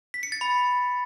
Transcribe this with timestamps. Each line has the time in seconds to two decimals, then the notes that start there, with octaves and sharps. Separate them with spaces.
0.14 B6
0.23 C#7
0.32 A6
0.41 B5